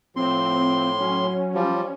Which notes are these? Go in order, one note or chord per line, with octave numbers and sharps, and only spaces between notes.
A2 F3 C4 C6
F#3 C#4
F3 G3